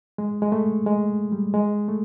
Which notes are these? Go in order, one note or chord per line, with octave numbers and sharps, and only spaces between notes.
G#3
G#3
A3
G#3
G3
G#3
A3